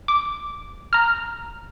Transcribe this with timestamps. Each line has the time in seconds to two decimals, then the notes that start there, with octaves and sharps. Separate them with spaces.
0.08 D6
0.93 A#5 F6